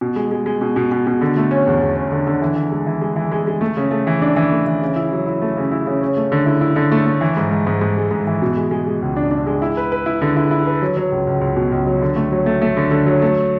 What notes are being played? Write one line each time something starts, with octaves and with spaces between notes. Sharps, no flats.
B2
G#3
G#3
G#3
B2
B2
B2
B2
D3
A3
C#4
E2
E2
C#4
D3
D3
E3
E3
G#3
E3
G#3
E3
G#3
G#3
A3
C#3
A3
E3
D4
E3
A3
E3
C#3
E4
F#3
E4
A3
C#3
E4
C#3
C#4
A3
D3
E4
E4
D3
A3
A3
E3
G#2
G#2
G#2
G#2
G#3
G#2
E3
B2
G#3
G#3
G#3
C#2
D4
D4
G#3
E4
B4
B4
E4
D3
E4
E4
B4
F#3
F#3
C#2
C#2
C#2
B2
C#2
F#3
D3
A3
F#3
A3
A3
D3
D3
F#3
A3